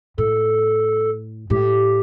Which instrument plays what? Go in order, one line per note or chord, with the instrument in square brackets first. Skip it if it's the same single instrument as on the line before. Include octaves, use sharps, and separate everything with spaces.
[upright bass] A2 [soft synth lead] A4
[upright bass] A2 [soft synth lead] G4